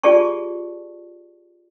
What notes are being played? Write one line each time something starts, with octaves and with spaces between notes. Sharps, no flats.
F4 G4 G#4 D5 A5 C#6